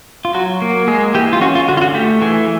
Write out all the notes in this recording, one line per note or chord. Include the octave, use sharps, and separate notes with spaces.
F4
F#3 F#4
A#3
G#3 G#4
E3 G4
F4
C#4 F#4
F4
D3 F#4
F4
F#4
A3 G4
E3 G#4